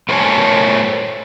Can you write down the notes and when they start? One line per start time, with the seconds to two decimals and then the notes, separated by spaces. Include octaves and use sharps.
0.09 A3 A#4 C5 C#5 G#5 A5